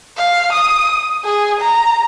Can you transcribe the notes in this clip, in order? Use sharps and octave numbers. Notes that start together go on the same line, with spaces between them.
F5
D#6
G#4
A#5